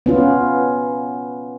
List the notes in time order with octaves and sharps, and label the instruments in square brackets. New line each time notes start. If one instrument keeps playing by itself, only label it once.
[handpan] B3 C#4 F4